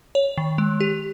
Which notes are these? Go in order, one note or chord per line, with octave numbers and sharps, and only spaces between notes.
C#5
D#3
G#3
G4